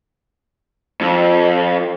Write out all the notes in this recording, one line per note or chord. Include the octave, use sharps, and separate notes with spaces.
F2